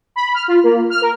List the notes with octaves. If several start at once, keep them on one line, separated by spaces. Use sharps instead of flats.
B5
F6
F4
A#3
F6
A#4